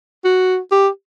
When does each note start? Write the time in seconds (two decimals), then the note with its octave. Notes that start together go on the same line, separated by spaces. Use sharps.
0.24 F#4
0.72 G4